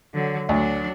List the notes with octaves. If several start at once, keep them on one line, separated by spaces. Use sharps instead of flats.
D3 F#3
D2 F#3 D4